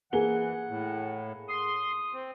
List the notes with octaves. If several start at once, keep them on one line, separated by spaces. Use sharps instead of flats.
E3 A#3 G#4 F#5 G7
A2
C6 D#6
C4